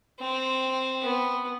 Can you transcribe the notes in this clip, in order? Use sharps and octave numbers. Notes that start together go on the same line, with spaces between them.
C4
B3